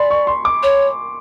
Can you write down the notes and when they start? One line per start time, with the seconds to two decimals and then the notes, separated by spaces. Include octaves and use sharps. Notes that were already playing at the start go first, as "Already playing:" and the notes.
Already playing: D5 G#5 B5 C6
0.10 C#6
0.27 C6
0.45 D6
0.63 C#5